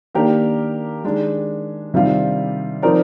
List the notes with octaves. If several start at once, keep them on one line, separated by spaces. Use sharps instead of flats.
D#3 A#3 D4 G4 A#4
D#3 G#3 D4
C3 D#3 G3 D4 F4
F3 C4 D#4 A#4 D5